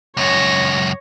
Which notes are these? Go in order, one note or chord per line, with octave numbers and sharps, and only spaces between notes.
C#2 F#2 C#5 A#6